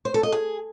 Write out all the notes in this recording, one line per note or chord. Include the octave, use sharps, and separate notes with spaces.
C5
A4
D#5
G#4